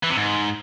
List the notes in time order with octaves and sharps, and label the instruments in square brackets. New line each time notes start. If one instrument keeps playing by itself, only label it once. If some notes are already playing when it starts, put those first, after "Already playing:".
[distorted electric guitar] E3
C3
G#2